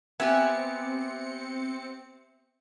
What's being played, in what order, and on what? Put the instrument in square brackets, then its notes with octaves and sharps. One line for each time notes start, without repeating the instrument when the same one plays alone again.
[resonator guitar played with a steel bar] B3 G4 [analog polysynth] C4 C#7 [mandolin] E5 G#5